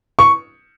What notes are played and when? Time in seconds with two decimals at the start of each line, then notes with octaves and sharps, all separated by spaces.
0.19 C#6